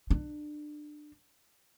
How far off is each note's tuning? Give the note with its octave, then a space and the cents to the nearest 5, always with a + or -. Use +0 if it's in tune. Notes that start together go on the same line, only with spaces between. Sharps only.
D4 +25